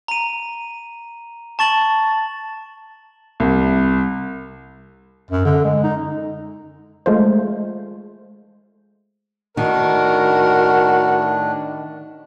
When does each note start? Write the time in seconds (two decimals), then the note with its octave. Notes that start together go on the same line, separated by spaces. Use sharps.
0.08 A#5 D#7
1.59 A5 C#6 A6 F#7
3.40 C2
5.31 F#2
5.45 D3
5.64 G#3
5.84 D#4
7.06 G#3 A3 F4 C5
9.57 A2 D#3 D4 F#4 A#4